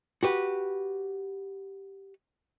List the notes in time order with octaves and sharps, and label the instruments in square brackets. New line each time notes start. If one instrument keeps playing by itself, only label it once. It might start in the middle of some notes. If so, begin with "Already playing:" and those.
[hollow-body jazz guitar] F#4 G4 B4